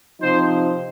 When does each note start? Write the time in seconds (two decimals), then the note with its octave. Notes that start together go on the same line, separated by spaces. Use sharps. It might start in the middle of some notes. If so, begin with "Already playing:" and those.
0.20 C3 F3 C4 D#4 C5